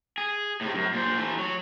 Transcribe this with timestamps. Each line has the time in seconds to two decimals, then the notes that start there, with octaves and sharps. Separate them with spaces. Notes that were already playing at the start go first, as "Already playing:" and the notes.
0.18 G#4
0.61 A2 C3
0.75 F#2
0.93 A#2 C5
1.18 E3 A3
1.38 F#3